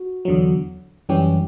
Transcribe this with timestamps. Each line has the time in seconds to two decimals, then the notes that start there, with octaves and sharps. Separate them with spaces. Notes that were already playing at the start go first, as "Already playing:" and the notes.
Already playing: F#4
0.25 E2 D3 F#3
1.09 F#2 E3 G3 C#4 G4